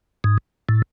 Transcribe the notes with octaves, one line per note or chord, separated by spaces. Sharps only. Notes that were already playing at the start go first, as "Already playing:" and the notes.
G#2
A2